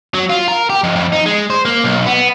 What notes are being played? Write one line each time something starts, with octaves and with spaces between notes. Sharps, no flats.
F#3
F4
A#4
G4
F2
F2
D#4
G#3
C5
A#3
B1
B3